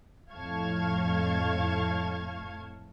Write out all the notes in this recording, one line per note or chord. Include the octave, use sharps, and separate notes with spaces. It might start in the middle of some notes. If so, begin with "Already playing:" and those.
F2 A2 F5 A5 C#6 G#6